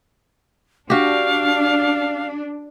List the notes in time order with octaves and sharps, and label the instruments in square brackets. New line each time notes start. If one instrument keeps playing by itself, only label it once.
[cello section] D4 [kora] F#4 G4 [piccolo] F5